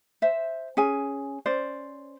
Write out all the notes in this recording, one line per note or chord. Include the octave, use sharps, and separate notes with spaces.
C5 E5
C#4 G#4 G#5
C#4 C5 D5